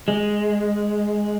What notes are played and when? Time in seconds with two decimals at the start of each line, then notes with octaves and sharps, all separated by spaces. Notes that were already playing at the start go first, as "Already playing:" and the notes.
0.08 G#3